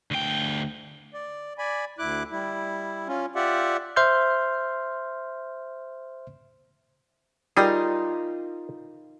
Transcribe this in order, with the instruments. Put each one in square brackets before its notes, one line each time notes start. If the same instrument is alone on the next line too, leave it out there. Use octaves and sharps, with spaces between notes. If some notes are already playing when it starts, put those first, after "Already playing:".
[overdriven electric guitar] D2 G5
[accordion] D5
D5 G#5 B5
D2 E4 D6 F#6
G3 E4
C#4 F4
F4 G4 D5 E5 F#5
[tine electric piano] C5 E5 C6 F6 G6
[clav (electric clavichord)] G3 G#4 [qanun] D#4 F4 A#4